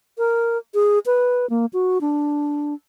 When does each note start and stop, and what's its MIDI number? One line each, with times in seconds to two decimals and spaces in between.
0.18 0.58 70
0.74 0.99 68
1.06 1.49 71
1.50 1.66 58
1.73 2.01 66
2.01 2.74 62